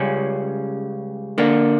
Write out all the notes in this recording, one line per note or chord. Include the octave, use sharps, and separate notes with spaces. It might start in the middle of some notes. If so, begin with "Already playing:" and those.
Already playing: C#2 C#3 G3 C#4
D3 A#3 D4